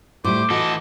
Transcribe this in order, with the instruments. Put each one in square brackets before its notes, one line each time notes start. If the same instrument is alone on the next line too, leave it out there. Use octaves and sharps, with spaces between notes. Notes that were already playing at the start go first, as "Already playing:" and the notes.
[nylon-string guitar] A2 G3 [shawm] C5 [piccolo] D6
[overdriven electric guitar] E3 A4 [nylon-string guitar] F#4 [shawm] D#5